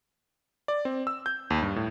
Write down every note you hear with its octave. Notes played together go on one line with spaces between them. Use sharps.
D5
C4
E6
G6
D#2
G2
A2